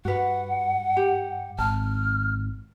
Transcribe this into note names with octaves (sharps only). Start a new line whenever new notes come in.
G2 F#4 B4 F#5
G4
G#1 A5 F6